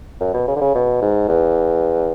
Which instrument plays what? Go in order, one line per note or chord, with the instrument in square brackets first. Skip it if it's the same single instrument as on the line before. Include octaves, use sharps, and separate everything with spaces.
[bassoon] F#2
B2
C#3
D3
C#3
B2
G#2
E2